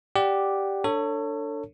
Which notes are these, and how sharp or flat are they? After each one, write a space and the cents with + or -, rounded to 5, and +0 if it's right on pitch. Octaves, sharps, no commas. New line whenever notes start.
G4 +0 D5 +0 F#5 +5
D4 +0 A4 +30 C#5 +0